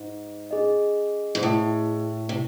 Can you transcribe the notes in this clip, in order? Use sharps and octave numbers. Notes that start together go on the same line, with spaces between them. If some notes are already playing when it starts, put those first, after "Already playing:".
Already playing: G#2
C#4 G#4 D#5
G#2
A2
C3